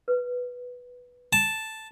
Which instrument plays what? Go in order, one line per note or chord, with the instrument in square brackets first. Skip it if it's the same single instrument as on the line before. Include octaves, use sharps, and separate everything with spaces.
[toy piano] B4
[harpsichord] A5